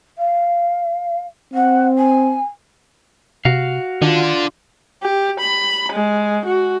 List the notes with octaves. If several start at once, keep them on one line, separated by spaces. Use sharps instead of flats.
F5
C4 F#5
G#5
C3 F#4 F5
D3 D#3 D4 F4
G4
B5
G#3
F#4